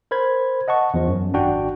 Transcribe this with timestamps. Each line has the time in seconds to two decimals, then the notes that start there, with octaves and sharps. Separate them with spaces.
0.11 A#4 C5 B5 G#6
0.68 D#5 F#5 A5 C#6
0.94 E2 F3
1.07 F#2
1.33 G#1 D4 F#4 G5